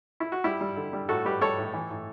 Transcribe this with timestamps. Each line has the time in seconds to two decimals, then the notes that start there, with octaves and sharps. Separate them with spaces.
0.20 E4
0.32 F#4
0.44 G3 E4 G4
0.61 G3
0.77 D3
0.93 G3
1.09 A2 F#4 A4
1.25 G3 G4 B4
1.41 G3 A4 C#5
1.58 A2
1.74 E3
1.90 A2